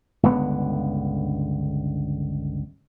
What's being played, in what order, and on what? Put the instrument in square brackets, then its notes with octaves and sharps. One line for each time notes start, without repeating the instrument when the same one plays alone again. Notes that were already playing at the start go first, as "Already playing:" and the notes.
[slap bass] G1 C#2 D3 B3